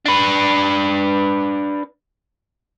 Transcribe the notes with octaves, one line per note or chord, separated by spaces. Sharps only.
D4 B4